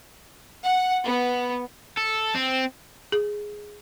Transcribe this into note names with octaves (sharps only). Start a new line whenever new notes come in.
F#5
B3
A4
C4
G#4